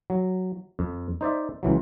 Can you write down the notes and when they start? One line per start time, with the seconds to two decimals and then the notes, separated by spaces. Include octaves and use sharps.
0.10 F#3
0.79 F2
1.21 D#4 C5 D5 E5
1.63 C#2 E3 F#3